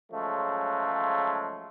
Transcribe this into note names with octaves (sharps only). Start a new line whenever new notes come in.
C#3 F3 F#3 G#3 A3